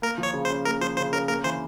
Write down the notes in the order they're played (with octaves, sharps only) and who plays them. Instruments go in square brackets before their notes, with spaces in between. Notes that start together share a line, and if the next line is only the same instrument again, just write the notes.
[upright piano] A#3 [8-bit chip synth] A#4
[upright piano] F3
[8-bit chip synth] C#5
[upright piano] C#3
[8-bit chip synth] C5
[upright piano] C#4
[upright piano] A#3 [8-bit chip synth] A#4
[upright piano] F3 [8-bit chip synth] C5
[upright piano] C#3 [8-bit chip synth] C5
[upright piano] C#4 [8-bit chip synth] A#4
[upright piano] A#3 [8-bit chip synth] A#4
[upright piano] E3 [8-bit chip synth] C5